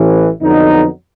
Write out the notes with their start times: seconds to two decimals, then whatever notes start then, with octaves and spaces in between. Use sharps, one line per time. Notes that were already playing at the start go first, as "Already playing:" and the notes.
Already playing: A1 A2 E3
0.41 F2 D3 F#3 B3 D#4